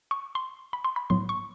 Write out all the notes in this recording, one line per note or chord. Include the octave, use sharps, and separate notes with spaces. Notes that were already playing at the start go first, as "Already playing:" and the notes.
C#6
C6
B5
C6
B5
A2 F#3 B3 C6
C#6